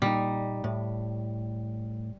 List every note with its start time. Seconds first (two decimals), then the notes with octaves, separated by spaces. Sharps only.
0.02 A#2 G3 D#4
0.64 A2